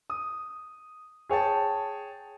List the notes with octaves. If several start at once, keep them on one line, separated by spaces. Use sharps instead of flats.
D#6
G#4 C#5 G5 A5